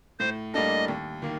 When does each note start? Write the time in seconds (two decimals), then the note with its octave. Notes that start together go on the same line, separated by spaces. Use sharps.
0.19 A2 C5
0.54 G3 A#3 D4 A4 D#5
0.88 D#2
1.22 D#3 A#3